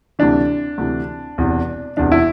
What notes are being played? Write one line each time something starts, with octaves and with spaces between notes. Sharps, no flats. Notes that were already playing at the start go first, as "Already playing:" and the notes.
D2 C3 E3 D4
D2 C3 E3
E1 E2 C3 E3
E1 E2 C3 E3 D4
E4